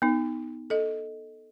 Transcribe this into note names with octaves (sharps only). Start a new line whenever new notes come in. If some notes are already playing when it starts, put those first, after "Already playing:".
B3 D#4
A4 D#5